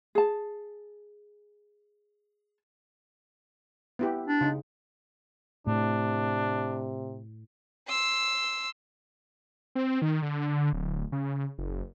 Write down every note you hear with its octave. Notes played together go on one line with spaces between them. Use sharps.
G#4 A5
B3 E4 G4
D4
C#3 D#4
A2 C3 D4
C6 E6
C4
D#3
D3
D1
C#3
F#1